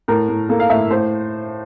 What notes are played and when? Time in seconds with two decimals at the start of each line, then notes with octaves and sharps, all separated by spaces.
0.08 A2 A#4
0.29 A2
0.49 A#3 A4
0.60 F5
0.70 A2 E5
0.90 A2 C5